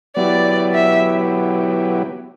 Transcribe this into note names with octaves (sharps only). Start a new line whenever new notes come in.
F#3 B3 E4 G4 D5
E5